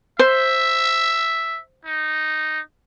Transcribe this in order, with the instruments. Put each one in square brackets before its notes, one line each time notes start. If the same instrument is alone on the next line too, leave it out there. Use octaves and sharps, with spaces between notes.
[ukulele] C5 [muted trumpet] E5
[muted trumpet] D#4